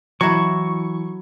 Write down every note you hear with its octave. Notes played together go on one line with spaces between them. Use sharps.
E3 F#3 E4 C#6